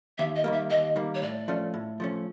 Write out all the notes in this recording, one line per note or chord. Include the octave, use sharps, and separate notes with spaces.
D#2 E5
D#5
D#3 G3 A#3
E5
D#2 D#5
D#3 G3 A#3
C#5
A2 D5
F3 A3 C#4
A2
F3 A3 C#4